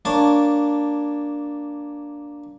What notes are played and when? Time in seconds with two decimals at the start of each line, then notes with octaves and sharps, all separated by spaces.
0.05 A#3 D4 C#5 A5 C#6